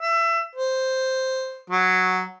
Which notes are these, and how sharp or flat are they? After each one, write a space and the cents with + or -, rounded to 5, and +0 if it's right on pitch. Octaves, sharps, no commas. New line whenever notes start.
E5 +25
C5 +0
F#3 +0